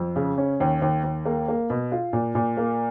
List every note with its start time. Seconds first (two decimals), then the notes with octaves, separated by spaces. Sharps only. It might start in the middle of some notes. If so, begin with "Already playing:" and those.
Already playing: F2
0.16 C#3
0.38 C#4
0.60 D#2
0.82 D#2
1.04 D#2
1.25 A#3
1.48 A#3
1.70 B2
1.92 F4
2.13 A#2
2.35 A#2
2.57 A#3